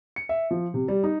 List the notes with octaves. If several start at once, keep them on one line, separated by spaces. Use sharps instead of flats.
C#7
E5
F3
C3
G3
D#4